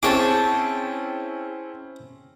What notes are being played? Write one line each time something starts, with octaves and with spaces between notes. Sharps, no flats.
C4 C#4 E4 G#4 C#5 G5 A5 D6